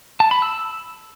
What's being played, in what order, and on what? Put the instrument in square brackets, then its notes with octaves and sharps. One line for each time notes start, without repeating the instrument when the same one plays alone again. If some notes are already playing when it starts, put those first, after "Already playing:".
[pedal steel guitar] A5
B5
E6